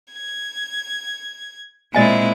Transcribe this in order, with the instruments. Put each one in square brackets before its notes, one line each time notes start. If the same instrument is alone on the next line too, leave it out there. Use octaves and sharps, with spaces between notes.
[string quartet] G#6
[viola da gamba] A#2 E4 [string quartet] G#3 C4 [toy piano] D5 D#5 G#5